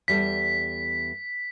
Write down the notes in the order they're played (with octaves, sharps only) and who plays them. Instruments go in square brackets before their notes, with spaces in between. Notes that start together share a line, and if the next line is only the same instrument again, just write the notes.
[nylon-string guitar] E2 G3 A4 [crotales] B6